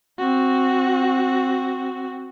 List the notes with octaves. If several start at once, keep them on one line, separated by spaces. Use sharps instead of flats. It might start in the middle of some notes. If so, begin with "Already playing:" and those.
C4 F#4